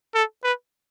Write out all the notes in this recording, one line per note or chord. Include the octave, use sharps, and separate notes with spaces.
A4
B4